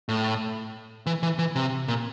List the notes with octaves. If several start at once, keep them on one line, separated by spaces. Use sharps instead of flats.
A2
E3
E3
E3
C3
A#2